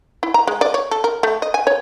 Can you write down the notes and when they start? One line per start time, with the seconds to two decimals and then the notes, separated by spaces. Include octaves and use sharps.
0.23 E4
0.34 A#5
0.47 G#3
0.61 D5
0.74 C#5
0.91 A4
1.04 A#4
1.23 A3
1.42 D#5
1.54 G#5
1.67 C#5